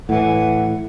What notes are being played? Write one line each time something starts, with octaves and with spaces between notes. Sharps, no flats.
A2 E3 F#5